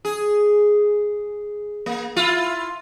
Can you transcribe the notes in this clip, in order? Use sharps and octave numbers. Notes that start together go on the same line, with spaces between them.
G#4
A#3
E4 F4